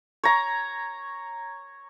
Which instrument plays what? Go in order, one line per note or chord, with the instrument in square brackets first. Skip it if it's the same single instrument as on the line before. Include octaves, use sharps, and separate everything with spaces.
[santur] C#5 A#5